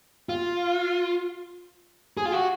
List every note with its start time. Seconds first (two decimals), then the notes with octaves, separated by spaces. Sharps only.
0.29 F4
2.17 G#4
2.26 F4
2.32 F#4